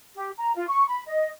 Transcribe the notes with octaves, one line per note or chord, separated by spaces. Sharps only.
G4
A#5
F4
C#6
B5
D#5